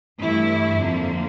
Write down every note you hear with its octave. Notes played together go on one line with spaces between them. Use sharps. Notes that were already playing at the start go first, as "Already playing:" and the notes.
G2 E3 A3 E4
F2 D3 F3 A#3